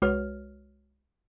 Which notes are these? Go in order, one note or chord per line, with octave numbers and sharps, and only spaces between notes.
C2 G#3 F#4 B4 C#5 F6